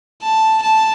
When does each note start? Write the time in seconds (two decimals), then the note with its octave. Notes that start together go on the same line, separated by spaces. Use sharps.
0.23 A5
0.63 A5